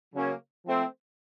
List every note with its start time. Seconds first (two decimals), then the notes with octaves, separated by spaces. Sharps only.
0.14 C#3 F#3 A#3 C#4
0.65 F3 A3 C4